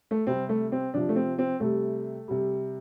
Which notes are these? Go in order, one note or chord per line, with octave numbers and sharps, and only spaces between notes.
A3
C3 G3 C4
A3
C4
C3 F3 D4
A3
C4
C4
C3 G3 A3
C3 G3